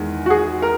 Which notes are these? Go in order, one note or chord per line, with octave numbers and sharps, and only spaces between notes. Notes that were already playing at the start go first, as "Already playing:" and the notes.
Already playing: E2 D#3 G#3
F#4
G#4
A#4